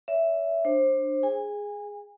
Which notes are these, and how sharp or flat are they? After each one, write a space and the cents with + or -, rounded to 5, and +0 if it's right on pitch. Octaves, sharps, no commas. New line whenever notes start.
C#5 +40 E5 +5
D4 +15 C5 +25
G#4 +0 G#5 -30